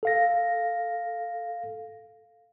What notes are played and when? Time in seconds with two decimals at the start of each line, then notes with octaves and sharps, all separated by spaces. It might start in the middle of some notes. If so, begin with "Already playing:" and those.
0.03 A4 F5 A#6